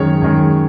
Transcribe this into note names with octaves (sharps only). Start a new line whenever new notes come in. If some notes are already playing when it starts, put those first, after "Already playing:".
Already playing: F#2 D#3 G#3 C#5
F#2 D#3 G#3